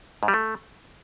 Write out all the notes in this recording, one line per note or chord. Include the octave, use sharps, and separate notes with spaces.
G#2
G3
A3